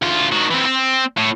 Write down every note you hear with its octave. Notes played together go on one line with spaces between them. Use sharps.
D2 F4
D#3 F#4
E3 C4
C4
A2